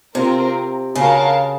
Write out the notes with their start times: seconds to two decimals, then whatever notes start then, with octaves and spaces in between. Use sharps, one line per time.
0.15 C3 C4 F4 A#4
0.95 C#3 F#4 A#4 C#5 F5 A5